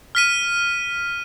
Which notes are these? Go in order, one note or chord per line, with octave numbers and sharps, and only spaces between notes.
F6 B6 D#7